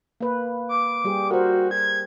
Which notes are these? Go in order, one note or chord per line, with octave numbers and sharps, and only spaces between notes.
A#3 B4
D6
G3 G4 G#4
F#4 A#4 C5
G#6